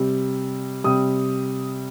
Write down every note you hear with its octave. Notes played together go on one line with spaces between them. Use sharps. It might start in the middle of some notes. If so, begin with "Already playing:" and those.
Already playing: C3 G3
C3 G3 D#6